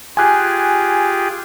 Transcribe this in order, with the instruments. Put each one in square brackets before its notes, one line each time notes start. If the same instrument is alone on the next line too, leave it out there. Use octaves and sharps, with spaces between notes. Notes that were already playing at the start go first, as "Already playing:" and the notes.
[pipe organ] F4 G4 G#4 [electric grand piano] G#5 F#6